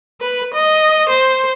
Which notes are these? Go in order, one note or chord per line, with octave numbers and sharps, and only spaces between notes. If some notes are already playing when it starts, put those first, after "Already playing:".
B4
D#5
C5